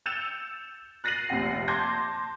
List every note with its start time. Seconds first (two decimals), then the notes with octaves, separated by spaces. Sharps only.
0.06 E6 G6 A6 C#7 E7 F7
1.04 F#6 A6 A#6 C7 D#7 F#7
1.29 F1 A#1 C3 F#5 C7
1.68 A5 C6 D6 G6 G#6 A#6